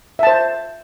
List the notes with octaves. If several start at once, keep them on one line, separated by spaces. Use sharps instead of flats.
C5 E5 A5